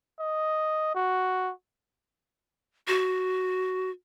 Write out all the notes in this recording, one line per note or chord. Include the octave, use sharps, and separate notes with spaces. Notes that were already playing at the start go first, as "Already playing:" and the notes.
D#5
F#4
F#4